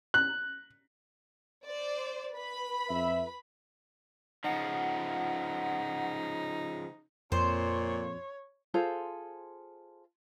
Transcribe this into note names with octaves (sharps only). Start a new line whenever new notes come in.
F#6
C5 D5
B4 B5
F2 E5
C#3 F3 D#4 F#5
F2 A#2 C5 C#5
F4 G#4 A4 C5